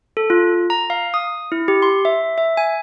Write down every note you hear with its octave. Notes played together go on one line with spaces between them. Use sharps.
A4
F4
A#5
F5
D#6
E4
G4
C6
E5
E5
G#5